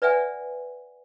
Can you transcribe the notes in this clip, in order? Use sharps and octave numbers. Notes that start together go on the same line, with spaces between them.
B4 D5 E5 F#5 G#5